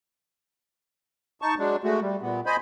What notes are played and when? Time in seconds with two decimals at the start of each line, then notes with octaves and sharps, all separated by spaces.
1.42 D#4 A5 C#6
1.58 F#3 G#3 D4
1.83 G#3 A3 F#4
2.01 G3
2.22 A#2 B3
2.46 C5 D#5 G#5 B5